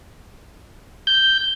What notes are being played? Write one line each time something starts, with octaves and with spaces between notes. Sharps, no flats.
G6